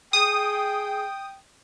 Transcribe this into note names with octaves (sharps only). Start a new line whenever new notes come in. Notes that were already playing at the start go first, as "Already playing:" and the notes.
G#4 G5 D#6